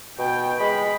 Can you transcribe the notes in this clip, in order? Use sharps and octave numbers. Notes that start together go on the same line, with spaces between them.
B2 G5
G#3 B5